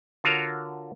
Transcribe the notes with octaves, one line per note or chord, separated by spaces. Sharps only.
D3 F4 F#4 A#4 C#5